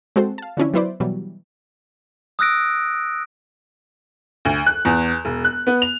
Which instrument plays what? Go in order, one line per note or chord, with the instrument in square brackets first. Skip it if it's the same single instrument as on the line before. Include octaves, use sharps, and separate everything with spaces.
[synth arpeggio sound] G#3 C4 F#4 A4 C5
F5 A5
D3 E3 F3 C#4 D4 E4
F#3 B3 E4 B4 C5 D5
B2 E3 F#3 G3
[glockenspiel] D#6 E6 F#6 A#6 D7
[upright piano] D2
F#6
E2
E1
F#6
B3
F7